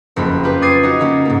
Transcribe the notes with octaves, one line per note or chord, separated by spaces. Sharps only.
F#1 F2 A#3 B5
F4 G4 B4
D6 D#6 G#6 A6 C7 D#7
D#4 F#4
C#3 A#3 C#4
G#2 A#3